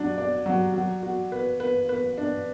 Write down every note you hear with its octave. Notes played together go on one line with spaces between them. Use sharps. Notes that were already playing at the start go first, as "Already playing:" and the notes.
Already playing: F#3 D4
D5
F#3
F#3
F#4
B4
B4
B4
D4